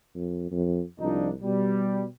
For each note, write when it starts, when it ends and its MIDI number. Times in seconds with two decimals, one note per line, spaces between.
0.16 0.48 41
0.52 0.81 41
1.00 1.33 36
1.00 1.29 53
1.00 1.29 62
1.00 1.29 63
1.42 2.07 47
1.42 2.03 55